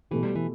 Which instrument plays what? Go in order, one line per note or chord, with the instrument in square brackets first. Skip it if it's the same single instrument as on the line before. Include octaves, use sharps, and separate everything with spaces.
[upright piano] B2 A3 G4 [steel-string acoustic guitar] E3
[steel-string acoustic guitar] G3
E3